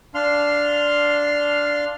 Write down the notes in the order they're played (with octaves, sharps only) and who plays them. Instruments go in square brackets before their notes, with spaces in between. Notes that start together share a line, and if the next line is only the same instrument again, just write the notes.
[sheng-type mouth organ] D4 F5 C6 F6